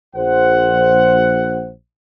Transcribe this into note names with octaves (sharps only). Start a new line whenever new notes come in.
A#1 C5 F#5